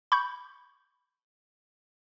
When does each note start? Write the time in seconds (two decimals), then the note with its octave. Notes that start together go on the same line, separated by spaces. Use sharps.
0.12 B5 C#6 G6